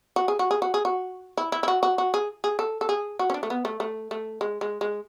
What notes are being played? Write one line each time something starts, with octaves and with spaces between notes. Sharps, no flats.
F#4
G#4
F#4
G#4
F#4
G#4
F#4
E4
E4
E4
F#4
F#4
F#4
G#4
G#4
A4
A4
G#4
F#4
C#4
D4
A3
B3
A3
A3
A3
G#3
G#3
G#3